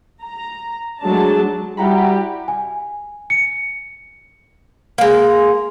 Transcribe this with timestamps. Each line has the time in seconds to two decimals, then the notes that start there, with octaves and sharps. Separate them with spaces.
0.23 A#5
1.01 F#3 G#3 A3 D4 A5
1.77 G3 E4 F#4 G4 F#5 A#5 B5
2.48 G#5
3.30 C#7
4.98 G#3 A#3